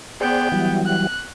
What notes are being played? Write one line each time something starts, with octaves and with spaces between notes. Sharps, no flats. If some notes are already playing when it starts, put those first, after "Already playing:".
B3 G#4 C5 D5 G5
E3 F#3 G3
F#6